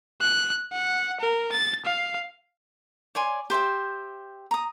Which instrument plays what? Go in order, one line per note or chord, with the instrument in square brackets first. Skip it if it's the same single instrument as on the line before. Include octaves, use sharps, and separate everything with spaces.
[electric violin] F#6
F#5
A#4
A6
F5
[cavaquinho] C#5 D5 G#5 C6
G4 C5 E5 G5
A#5 D#6